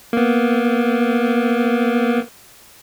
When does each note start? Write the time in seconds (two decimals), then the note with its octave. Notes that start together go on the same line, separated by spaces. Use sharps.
0.13 A#3 B3